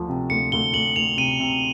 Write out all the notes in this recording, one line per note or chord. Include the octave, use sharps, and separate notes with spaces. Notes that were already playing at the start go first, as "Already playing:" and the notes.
Already playing: D2 F3
C3
D2 C#7
D2 G7
D2 F#7
D2 F7
C3 D#7
C3